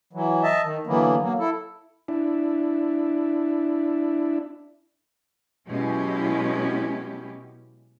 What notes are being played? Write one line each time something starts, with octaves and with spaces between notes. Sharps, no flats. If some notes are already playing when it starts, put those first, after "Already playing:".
E3 F#3
D#5 E5 A5
D#3
D3 E3 F#3 A#3 B3
F#3 A#3
E4 A4
D4 E4
B2 F#3 G#3 C#4 E4 G4